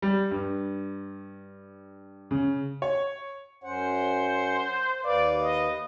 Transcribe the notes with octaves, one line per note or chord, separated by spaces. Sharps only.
G3
G2
C#3
C#5
F#2 C#4 C5 F#5
D#2 B4 D5 F5
D#5